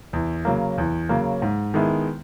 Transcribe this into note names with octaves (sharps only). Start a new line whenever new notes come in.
E2
C#3 F#3 A#3
E2
C#3 F#3 A#3
G#2
D#3 G#3 B3 E4